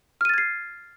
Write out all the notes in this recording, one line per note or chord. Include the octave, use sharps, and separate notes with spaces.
F6 G#6 A6 C7 D#7